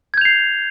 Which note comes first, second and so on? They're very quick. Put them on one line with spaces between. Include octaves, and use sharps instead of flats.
G#6 G6 F7 C7